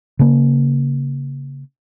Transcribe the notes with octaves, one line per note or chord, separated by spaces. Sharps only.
C#3 A#3